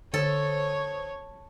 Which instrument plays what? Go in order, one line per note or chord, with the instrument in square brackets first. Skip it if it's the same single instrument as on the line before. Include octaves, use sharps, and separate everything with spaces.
[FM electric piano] D3 C5 D#6 [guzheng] A4 [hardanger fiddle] C#5